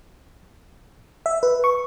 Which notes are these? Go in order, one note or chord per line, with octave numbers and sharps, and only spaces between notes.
E5
B4
C#6